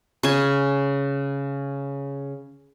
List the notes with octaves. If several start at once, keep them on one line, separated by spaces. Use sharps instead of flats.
C#3 G#5